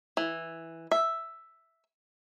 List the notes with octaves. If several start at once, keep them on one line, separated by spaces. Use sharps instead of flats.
E3
E5